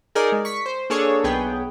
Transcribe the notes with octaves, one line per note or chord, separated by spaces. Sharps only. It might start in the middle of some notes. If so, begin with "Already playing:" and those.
D#4 G#4 A#4 D5 A#5
G#3
C#6 B6
C5
A#3 D4 G#4 A4 C#5
B1 B3 G#4 G5